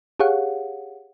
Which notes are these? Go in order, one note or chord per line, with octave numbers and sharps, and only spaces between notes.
G4 G#4 C#5 F5 F#5